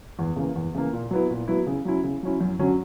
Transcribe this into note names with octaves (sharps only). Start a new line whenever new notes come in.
E2
C#3 E3 A#3
E2
C#3 E3 A#3
A#2
F#3 B3 E4
A#2
F#3 B3 E4
C#3
F#3 C#4 E4
C#3
F#3 C#4 E4
F#2
D3 F#3 C#4